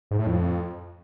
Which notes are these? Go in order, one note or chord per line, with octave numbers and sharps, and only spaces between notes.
G#2
A2
F2